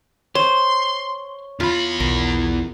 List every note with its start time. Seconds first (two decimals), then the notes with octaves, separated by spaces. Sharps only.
0.35 C5 C#5 C6
1.60 E2 F4 B5
2.00 B1 A#4